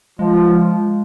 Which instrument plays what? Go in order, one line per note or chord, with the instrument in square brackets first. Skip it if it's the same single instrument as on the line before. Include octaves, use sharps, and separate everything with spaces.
[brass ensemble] F3 [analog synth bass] G#3